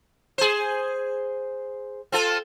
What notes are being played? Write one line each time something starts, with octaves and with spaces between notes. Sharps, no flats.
G#4 C5
C4 F4 A4